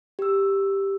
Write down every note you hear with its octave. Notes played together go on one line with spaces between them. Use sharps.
G4 E6